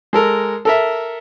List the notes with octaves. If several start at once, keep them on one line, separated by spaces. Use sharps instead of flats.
G#3 A4 A#4
A4 A#4 E5